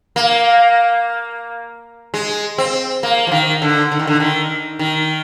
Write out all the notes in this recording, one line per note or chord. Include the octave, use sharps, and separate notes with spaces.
A#3
G#3
C4
A#3
F3
D#3
D3
D3
D#3
D3
D#3
D#3